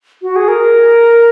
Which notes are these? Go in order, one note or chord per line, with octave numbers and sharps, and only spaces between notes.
F#4
G#4
A#4